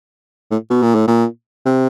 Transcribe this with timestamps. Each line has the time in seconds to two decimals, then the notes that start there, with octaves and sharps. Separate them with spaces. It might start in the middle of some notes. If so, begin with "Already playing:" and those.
0.51 A2
0.70 B2
0.82 A#2
0.95 A2
1.07 A#2
1.65 C3